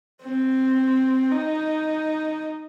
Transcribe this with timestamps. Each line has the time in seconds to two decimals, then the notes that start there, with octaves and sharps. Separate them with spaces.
0.22 C4
1.32 D#4